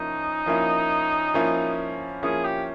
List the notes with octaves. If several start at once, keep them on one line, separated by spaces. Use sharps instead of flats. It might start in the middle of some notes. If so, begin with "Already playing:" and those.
Already playing: F3 A#3 C#4 D#4 E4
F3 A#3 C#4 E4
F3 A#3 C#4 E4
F3 A#3 C#4 E4 G#4
G4